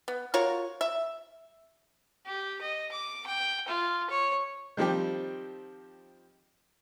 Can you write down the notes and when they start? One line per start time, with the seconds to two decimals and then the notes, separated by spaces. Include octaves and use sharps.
0.08 B3
0.34 F4 F#4 A#4 C#5
0.81 E5
2.26 G4
2.61 D#5
2.92 D6
3.26 G5
3.68 F4
4.10 C#5
4.77 D#3 F3 G3 C4 G4